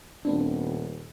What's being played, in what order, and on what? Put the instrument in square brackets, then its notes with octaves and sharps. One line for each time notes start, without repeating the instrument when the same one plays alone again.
[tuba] D#1 [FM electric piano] A3 B3 C4 [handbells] D4